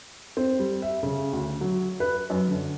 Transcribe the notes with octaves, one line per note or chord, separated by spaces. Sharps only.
C4
G3
E5
C#3
D2
F#3
B4
F#2
D3